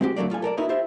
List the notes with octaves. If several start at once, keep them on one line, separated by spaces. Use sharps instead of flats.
G#3 C4 F#4 G4
D3 F#3 A3 A#3 D5
A2 F4 A4 G#5
A4 A#4 D5 A5
A#3 D#4 E4 F#4 A#4 B4
E4 F4 G4 C5 E5